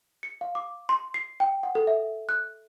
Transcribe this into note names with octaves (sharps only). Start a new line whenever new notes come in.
C#7
F5
D6
C6
C7
G5
F#5
A4
E5
F#6